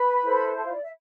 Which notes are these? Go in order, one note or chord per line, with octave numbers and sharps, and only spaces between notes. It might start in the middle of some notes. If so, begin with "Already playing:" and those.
Already playing: B4 B5
E4 A4 C5
A4 A5
F4 F5
D5
E5